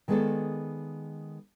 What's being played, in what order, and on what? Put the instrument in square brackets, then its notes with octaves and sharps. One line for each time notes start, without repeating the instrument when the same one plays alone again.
[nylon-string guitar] D#3 G#3 B3 G#4 A4 D5